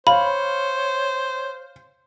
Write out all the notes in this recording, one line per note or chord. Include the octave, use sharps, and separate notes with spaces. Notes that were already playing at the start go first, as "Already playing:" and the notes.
C5 C#5 F5 B5